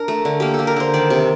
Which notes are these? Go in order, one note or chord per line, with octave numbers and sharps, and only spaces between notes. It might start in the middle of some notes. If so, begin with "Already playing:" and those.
Already playing: D4 A#4
A3
D3
A#3 G4
A4
A#3
A#4
D3 C5
D#3 D5
C3